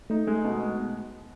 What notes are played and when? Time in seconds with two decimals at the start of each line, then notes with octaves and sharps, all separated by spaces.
0.10 A3 D#4
0.27 G#3 A3
0.44 B2